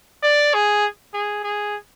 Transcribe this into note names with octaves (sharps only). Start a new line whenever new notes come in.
D5
G#4
G#4
G#4